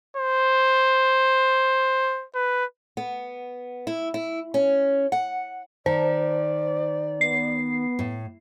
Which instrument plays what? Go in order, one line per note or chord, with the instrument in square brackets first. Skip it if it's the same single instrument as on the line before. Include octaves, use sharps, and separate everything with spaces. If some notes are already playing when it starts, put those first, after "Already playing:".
[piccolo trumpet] C5
B4
[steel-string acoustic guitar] B3
E4
E4
C#4
F#5
[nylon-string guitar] D#3 [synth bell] C5 [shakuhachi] D5
[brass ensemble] B3 [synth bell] C7
[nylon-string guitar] A2